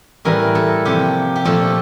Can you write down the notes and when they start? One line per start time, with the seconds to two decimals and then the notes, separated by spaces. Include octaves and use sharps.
0.25 A2 E3 G3 A#4
0.55 A4
0.85 C3 F3 A#3 G4
1.36 G4
1.45 A#2 F3 A3 A4